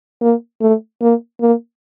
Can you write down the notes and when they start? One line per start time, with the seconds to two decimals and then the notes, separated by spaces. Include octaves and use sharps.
0.22 A#3
0.61 A3
1.02 A#3
1.41 A#3